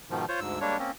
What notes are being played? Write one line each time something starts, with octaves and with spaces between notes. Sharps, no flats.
G#2 B2 D#3 F3
F4 C5 C#5
D2 G#2 E6
G3 G#3 A#3 D4 C#5
A#3 C4 C#4